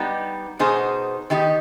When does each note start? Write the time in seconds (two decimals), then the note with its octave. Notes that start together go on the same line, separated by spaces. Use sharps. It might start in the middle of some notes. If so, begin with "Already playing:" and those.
Already playing: G3 B3 D#4 G4
0.59 B2 B3 D#4 G#4 C5
1.30 D#3 B3 D#4 G4